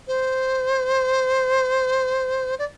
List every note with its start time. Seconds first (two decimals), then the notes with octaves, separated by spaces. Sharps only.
0.08 C5
2.59 D5